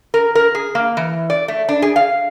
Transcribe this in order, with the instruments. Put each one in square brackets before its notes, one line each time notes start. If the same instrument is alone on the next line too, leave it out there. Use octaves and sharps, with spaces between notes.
[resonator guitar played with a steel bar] A#4
A#4
G#4
A#3
E3
D5
A3
D4
G#4
F5